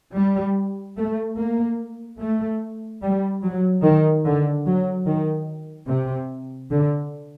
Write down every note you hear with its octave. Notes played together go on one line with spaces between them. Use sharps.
G3
A3
A#3
A3
G3
F#3
D#3
D3
F#3
D#3
C3
D3